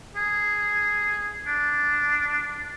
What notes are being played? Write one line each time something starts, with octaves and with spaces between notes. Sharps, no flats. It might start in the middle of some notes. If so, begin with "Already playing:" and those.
G#4
D4